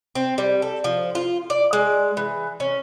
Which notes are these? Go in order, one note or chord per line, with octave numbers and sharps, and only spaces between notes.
C4
G3
A4
F3
F4
D5
G#3
E3
C#4